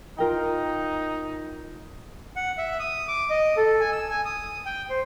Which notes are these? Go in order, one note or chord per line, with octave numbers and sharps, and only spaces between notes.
D#4 F4 A#4 G5
F#5
E5
D#6
D6
D#5
A4
G#5
E6
G#5
D#6
G5
C5